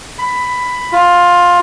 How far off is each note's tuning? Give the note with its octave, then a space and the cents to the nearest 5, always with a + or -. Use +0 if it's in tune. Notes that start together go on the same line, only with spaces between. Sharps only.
B5 +10
F4 +15